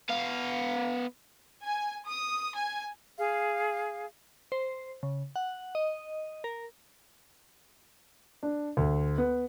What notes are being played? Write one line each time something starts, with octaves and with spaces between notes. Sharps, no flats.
B3 F5
G#5
D#6
G#5
G#4 F5
C5
C#3
F#5
D#5
A#4
D4
D2
B3